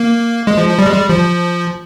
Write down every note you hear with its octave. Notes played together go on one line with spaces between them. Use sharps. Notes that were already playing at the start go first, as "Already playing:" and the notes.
Already playing: A#3
G#3
F3
F3
G3
G#3
G3
F3